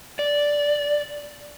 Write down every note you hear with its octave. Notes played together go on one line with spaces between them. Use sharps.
D5